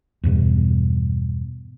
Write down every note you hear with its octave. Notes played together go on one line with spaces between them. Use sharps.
E2 G2 B2